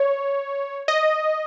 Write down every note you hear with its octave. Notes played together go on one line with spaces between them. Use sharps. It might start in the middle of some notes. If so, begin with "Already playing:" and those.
Already playing: C#5
D#5